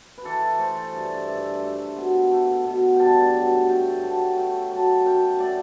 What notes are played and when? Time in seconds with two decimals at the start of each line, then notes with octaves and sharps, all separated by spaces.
0.18 B4
0.25 E3 A4
0.59 A3 C5
0.93 G2
1.28 G2 E5
1.62 A3
1.96 B2
2.31 A3
2.65 B2
2.96 G2 G5 A5
3.34 F#3
3.69 A3 G5
4.03 F#3 A5
4.37 A3 G5
4.71 F#3 A5
5.05 F#2 G5
5.40 A3 D5